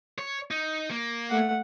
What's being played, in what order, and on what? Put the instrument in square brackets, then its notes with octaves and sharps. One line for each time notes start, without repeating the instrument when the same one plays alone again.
[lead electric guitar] C#5
D#4
A#3
[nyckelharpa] A3 F#5